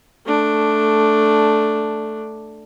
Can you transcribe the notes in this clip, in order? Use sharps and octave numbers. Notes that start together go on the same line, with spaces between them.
A3 D4